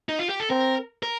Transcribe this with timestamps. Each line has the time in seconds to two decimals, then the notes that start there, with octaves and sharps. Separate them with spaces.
0.09 D#4
0.19 F4
0.29 G4
0.40 A4
0.50 C4 A#4
1.03 A#4